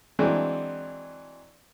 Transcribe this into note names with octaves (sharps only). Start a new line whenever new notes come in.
E3 F#3 G#3 C4 D4